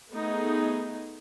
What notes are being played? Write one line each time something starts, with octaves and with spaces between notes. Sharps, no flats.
A3 B3 D#4 G#4